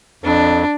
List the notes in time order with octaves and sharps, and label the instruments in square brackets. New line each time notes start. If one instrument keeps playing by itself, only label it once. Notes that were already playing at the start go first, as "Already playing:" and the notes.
[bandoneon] F2 [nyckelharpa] D4